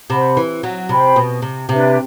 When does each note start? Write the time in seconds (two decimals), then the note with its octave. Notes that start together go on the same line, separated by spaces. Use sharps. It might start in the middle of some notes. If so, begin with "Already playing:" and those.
0.10 C3 C5 F#5 B5
0.37 E3
0.63 F#3
0.89 C3 C5 G5 B5
1.16 B2
1.42 C3
1.69 C3 D4 G4 B4 E5